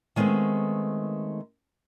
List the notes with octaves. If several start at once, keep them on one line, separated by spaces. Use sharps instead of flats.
D#3 G#3 A3 B3 C4